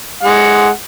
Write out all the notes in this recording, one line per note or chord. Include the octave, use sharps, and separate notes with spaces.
G#3 F#5